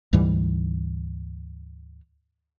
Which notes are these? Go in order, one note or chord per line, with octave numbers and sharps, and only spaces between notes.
D2 G#2 E3 G3